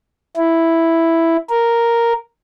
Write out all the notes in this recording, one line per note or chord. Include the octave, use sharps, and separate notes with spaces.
E4
A#4